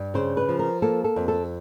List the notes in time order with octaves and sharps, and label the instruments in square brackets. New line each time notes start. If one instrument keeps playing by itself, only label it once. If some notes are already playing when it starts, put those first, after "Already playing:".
Already playing: [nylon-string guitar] G2
C#3 C5
B4
F3
A#4
A#3 A4
A4
F2
A4